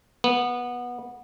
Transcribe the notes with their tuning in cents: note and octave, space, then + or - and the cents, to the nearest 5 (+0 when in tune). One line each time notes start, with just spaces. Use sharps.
B3 -15